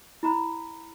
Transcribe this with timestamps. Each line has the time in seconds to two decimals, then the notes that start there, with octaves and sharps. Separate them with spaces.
0.23 E4 A#5 B5